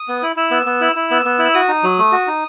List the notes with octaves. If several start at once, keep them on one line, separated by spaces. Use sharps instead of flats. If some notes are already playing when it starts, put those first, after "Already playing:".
Already playing: D#6
B3
E4
E4 E6
B3
B3
E4
E4
B3
B3
E4
E6
F#4 D#6
D#4
F#3
A3
F#4
D#4